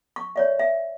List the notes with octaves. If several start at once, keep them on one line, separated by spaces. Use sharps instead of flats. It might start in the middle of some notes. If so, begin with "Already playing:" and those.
C#6
C#5 D5 E5
E5